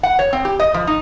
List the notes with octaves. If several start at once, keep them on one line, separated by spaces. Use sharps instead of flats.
F#5
C#5
C4
G4
D#5
F3
D#4